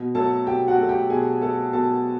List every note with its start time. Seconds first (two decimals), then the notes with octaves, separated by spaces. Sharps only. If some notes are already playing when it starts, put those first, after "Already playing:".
Already playing: B2
0.15 F#3 A3 A4 A5
0.46 B2 G4 G5
0.68 F#4 F#5
0.78 F#3 A3
0.89 G4 G5
1.10 B2 G#4 G#5
1.42 F#3 A3 A4 A5
1.73 B2 A4 A5